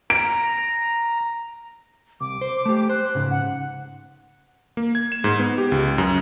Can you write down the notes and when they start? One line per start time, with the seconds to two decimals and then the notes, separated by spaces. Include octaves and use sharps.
0.10 A#5 D7
2.20 C2 D6
2.41 C5
2.66 A3 G4
2.89 C5 F#6
3.15 G#2 C#3
3.31 F#5
4.77 A#3
4.95 G#6
5.12 E7
5.24 G#2
5.40 B3
5.58 G4
5.72 C#2
5.98 F#2